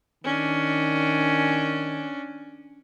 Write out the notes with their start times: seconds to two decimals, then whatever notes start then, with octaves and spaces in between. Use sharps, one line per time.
0.24 D#3 C#4 D4